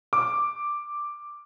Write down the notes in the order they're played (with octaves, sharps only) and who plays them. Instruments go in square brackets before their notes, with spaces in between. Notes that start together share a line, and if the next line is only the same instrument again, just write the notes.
[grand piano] D6